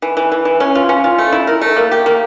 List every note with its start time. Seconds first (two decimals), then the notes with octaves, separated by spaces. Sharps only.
0.02 E3
0.17 E3
0.32 E3
0.45 E3
0.60 C#4
0.75 F4
0.89 C#4
1.04 F4
1.18 A3
1.33 E4
1.47 A#4
1.62 A3
1.77 A#3
1.91 G4
2.06 A#3